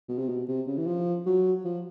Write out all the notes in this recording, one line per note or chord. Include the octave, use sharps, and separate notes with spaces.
B2
C3
B2
C3
C#3
E3
F3
F#3
F3